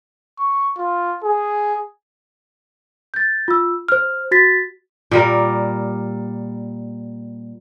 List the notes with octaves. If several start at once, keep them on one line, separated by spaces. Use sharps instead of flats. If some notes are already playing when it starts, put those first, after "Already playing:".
C#6
F4
G#4
G6 A6
F4 E6
C5 F6
F#4 A6 B6
A#2 G3 A#4